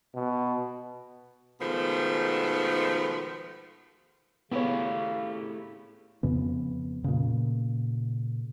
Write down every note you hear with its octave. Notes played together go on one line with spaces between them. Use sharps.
B2
B2 D#3 F3 G#3 A3 B3
C#3 A3 B3 E4 G4 C#5
F2 C#3 B3
A#2 C#3